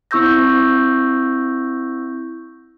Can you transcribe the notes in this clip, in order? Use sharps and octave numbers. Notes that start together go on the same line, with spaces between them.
C4 E4 C#6 E6 G6 A#6